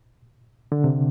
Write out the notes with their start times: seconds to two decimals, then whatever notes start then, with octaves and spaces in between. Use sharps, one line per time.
0.72 D3
0.84 C3